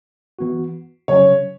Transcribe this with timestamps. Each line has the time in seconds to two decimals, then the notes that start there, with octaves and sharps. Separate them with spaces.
0.39 E3 B3 F#4
1.08 C#3 F#3 C#4 C#5